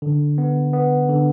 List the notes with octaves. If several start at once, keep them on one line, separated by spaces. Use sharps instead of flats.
D3
B3
B3
D3